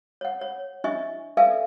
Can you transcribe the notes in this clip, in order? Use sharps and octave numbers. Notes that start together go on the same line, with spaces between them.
C#5 F#5
C#5
D4 E4 D#5 E5 G#5 C#6
A4 B4 D5 E5 F5 G#5